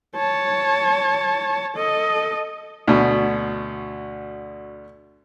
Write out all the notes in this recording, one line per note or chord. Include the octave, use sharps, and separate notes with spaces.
C#5 A5
A4 D#5
D2 B2